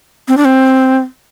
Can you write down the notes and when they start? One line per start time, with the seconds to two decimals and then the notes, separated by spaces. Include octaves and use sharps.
0.28 C4
0.37 D4
0.45 C4